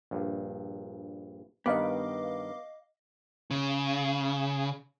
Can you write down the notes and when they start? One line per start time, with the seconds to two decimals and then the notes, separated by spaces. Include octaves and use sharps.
0.11 A#1 G2
1.66 G2 D#3 G3 B3 D#5 F5 D6
3.51 C#3